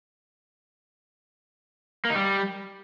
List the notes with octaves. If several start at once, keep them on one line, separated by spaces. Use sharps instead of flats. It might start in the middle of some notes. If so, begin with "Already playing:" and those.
A#3
D#4
G3